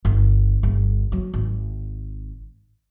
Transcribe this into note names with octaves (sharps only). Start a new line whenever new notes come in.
G1
G1
F#3
G#1